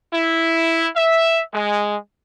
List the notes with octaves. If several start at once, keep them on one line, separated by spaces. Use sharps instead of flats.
E4
E5
G#3